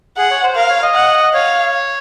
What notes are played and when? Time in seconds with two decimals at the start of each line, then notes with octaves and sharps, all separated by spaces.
0.18 G#4 F#5
0.31 C#5
0.44 C5
0.56 A#4 F5
0.70 C#5
0.83 D#5
0.95 F#5
1.34 C#5 F5